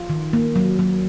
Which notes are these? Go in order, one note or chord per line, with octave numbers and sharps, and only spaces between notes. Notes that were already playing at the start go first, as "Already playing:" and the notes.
Already playing: F4
D#3
A#3
F#3
F#3